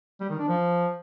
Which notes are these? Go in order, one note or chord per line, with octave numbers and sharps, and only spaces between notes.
G3
D#3
D4
F3